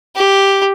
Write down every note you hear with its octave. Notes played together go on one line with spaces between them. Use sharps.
G4